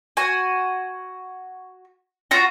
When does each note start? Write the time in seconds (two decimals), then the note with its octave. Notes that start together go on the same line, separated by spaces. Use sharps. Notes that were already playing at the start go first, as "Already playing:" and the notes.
0.17 F#4 G#5
2.31 F4 F#4 A#5